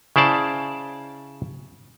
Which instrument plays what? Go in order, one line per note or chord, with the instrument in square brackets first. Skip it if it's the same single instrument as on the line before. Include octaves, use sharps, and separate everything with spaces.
[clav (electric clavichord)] C#3 E4 C5 D5 A5